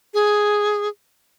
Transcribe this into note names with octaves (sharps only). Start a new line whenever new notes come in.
G#4